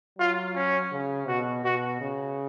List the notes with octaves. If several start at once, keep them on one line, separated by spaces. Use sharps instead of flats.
F#3 F4
C#4
C#3
B2 F#4
B2 F#4
C#3